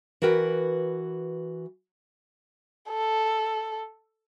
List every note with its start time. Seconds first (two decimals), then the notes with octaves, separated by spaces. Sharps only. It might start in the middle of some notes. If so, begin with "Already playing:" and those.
0.22 E3 F#4 A#4 B4 G5
2.90 A4